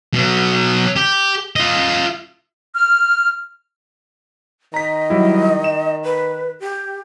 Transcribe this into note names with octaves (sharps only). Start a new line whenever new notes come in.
B2 F#3
G4
F4 D#5
F6
D#3 D#5 A#5 B6
F#3 G3 E4
E7
B4
G4